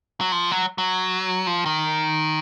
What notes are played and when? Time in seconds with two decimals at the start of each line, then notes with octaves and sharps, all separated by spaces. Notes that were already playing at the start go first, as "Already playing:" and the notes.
0.21 F#3
0.32 F3
0.51 F#3
0.78 F#3
1.47 F3
1.66 D#3